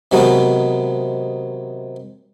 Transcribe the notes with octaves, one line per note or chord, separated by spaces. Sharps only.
C3 D#3 F#3 G#3 B3